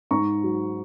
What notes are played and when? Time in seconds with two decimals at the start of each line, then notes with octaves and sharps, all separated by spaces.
0.11 G#2 A#5 C#6
0.44 F#3